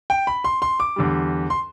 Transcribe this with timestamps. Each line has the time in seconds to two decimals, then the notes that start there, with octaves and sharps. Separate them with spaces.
0.10 G5
0.27 B5
0.44 C6
0.62 C6
0.80 D6
0.96 E2 D3 G3
1.50 C6